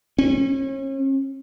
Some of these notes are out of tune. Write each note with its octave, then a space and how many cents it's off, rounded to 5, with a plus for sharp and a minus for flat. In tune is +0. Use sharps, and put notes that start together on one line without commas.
C#4 -40